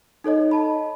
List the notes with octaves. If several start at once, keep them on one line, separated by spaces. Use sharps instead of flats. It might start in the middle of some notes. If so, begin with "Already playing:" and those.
D#4 A4 C#5 D#5
D#5 A5 B5